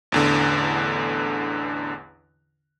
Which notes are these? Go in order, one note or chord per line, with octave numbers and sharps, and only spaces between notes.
A1 E2 D3